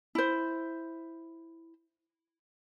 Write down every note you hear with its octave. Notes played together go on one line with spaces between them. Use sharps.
E4 C5